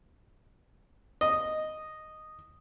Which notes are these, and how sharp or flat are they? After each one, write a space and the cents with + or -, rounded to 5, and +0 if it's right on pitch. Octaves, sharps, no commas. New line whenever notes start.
D#5 -5